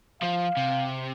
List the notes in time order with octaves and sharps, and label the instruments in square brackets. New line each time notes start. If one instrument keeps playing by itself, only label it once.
[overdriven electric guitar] F3 [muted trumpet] F5
[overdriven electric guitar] C3